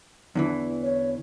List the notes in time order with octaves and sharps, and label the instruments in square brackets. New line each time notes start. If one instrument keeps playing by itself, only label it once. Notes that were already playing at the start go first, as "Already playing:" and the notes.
[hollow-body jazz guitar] E2 D3 E3
[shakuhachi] C#5